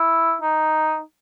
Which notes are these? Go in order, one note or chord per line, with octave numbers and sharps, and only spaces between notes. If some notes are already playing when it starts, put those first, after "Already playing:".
Already playing: E4
D#4